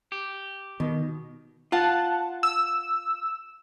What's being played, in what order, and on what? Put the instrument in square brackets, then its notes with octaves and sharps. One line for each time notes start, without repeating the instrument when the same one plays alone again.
[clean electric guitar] G4
[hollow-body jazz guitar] B2 [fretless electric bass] D#3
[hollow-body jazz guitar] F4 [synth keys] F#5 A5
[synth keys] E6